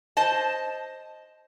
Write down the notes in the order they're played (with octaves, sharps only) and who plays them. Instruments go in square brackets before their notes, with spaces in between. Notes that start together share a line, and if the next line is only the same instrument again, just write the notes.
[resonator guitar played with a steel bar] C5 D#5 A5